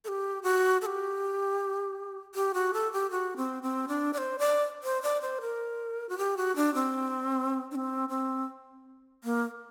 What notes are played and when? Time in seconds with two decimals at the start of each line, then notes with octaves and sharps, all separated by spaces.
0.04 A4
0.08 G4
0.43 F#4
0.82 A4
0.86 G4
2.35 G4
2.54 F#4
2.73 A4
2.93 G4
3.11 F#4
3.37 C4
3.63 C4
3.88 D4
4.13 D5
4.18 C5
4.39 D5
4.84 C5
5.03 D5
5.22 C5
5.41 A#4
6.09 F#4
6.18 G4
6.37 F#4
6.56 D4
6.75 C4
7.71 D4
7.75 C4
8.09 C4
9.24 A#3